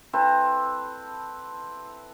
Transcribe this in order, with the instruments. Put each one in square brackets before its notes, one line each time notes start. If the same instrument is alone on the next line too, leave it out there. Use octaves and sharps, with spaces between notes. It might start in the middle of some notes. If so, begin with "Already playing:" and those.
[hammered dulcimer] C4 E4 A4 B4